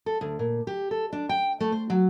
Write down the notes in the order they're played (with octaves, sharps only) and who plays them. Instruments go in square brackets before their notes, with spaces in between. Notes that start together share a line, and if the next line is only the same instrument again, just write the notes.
[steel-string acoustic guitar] A4
D2
A#2
G4
A4
D4
G5
A3
C5
F#3